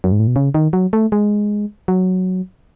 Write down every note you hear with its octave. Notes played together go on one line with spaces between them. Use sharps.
F#2
G#2
A2
B2
C#3
D#3
F#3
A3
G#3
F#3